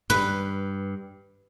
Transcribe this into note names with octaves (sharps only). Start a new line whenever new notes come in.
G2 B4